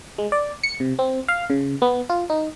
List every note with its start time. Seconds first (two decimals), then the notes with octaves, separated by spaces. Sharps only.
0.18 G#3
0.32 D5
0.63 C#7
0.80 C3
0.99 C4
1.28 F5
1.50 C#3
1.82 B3
2.10 F4
2.30 D#4